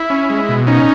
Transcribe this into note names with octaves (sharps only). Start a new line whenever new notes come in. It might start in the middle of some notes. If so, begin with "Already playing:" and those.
Already playing: E4
C#4
G#3
B2
C#4 D#4